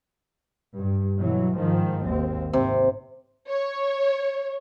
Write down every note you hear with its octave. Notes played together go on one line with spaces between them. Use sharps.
G2
B2 E3 F#3
G#2 D#3 F3
G#1 D#2 C4
G#1 C3
C#5